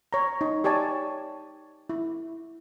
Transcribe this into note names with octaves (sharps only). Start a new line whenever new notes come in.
C#5 A#5
D#4
G4 C#5 D5 G#5 A5
E4